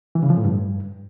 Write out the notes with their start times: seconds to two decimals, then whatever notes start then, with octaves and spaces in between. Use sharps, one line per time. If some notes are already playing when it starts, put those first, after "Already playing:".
0.15 E3
0.23 C#3
0.30 F3
0.37 A2
0.45 G2